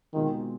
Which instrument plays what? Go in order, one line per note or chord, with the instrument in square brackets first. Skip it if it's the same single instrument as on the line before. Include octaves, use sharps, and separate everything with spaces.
[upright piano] B2 G#3 C4 F4 [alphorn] D#3